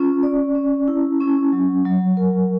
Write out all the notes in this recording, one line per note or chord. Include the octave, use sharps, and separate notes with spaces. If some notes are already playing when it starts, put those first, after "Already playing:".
Already playing: C#4 F4
D5
C#4
E4
C#4
F#3
F#3
A#4